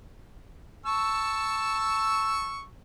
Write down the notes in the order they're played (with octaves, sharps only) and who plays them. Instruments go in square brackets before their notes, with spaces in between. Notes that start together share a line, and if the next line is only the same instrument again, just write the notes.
[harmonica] A5 C#6 E6